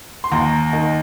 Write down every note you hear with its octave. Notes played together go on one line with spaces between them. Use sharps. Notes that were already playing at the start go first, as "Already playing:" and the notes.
C6
D#2 A#5
D#3